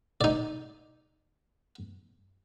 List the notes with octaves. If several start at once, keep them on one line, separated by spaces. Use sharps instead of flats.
D#4 D5